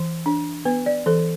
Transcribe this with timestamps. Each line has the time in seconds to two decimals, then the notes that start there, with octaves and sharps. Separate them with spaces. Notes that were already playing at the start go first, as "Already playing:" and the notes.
Already playing: E3
0.26 D4
0.65 B3 B4
0.86 D5
1.06 E3 A4